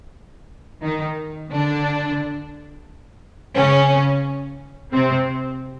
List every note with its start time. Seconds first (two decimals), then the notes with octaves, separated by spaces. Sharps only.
0.82 D#3 D#4
1.50 D3 D4
3.56 C#3 C#4
4.93 C3 C4